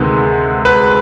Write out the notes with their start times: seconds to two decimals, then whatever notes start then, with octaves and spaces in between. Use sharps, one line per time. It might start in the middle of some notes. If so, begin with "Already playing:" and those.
Already playing: D2 C3 D#3 G#3 B3
0.65 B4